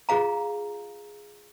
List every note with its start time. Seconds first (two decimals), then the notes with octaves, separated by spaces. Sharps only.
0.09 F4 G#4 F5 A#5